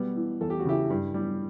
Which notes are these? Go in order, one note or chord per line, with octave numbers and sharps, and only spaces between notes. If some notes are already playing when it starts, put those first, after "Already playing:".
Already playing: B2 G3 B3
E3
E2 A4
G4
F#4
C#3 E4 G4
G2
G3